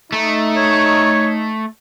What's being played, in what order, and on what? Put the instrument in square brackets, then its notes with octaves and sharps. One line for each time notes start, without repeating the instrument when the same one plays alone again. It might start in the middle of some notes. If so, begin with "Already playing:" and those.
[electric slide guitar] A3 [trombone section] D#4
[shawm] C#5